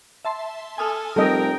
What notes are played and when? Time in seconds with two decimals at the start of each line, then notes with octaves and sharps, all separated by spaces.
0.25 E5 A5 C6
0.78 A4 G#5 D#6 F6
1.16 F1 G3 A4 A#4 D#5 G5